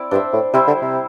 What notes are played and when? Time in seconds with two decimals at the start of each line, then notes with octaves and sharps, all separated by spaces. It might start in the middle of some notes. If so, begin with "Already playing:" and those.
Already playing: C4 E4 D5
0.11 G2 D4 C5 E5
0.33 A2
0.54 C3 G3 E4 C5 E5
0.67 D3
0.82 C3